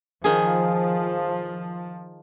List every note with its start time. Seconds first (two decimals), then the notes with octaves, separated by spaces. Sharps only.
0.24 D#3 F3 G#4